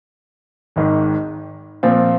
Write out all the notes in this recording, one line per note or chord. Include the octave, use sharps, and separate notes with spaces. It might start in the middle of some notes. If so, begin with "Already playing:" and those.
G#1 G#2 D#3
A#2 F3 C4 F4